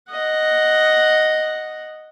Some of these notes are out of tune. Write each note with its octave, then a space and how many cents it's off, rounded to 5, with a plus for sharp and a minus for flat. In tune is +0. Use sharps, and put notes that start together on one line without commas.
D#5 +0 F#5 +0